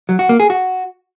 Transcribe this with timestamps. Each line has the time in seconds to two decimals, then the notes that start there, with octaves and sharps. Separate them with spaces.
0.09 F#3
0.19 F#4
0.29 A#3
0.40 G#4
0.50 F#4